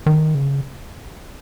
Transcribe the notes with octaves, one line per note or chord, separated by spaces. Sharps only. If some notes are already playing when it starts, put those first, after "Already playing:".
D#3
C#3